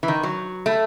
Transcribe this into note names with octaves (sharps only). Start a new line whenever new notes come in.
E3
D#3
F#3
A3